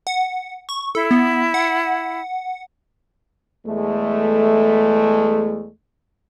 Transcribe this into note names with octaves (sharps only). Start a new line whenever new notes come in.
F#5
C#6
E4 A4
B3
F#5
E2 G#3 A3